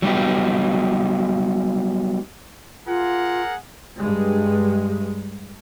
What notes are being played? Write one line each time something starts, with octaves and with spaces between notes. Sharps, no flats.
F#3 G3 B3 D#4 G4
F4 G#4 A#4 F#5
G2 G#3